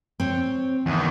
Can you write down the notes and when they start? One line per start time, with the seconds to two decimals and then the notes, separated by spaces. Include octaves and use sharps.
0.20 C4 C#5
0.86 E2 D#3